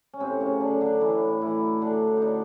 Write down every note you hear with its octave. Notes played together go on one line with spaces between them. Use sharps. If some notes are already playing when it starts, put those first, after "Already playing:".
C#4
A2 C3 C4
C#3 C#4
F#3
D3 D4
F#3
D3 D4
A2 E3 E4
A2
E3 E4
F#3
D3 F#3 D4
A2
D#4
D3 D4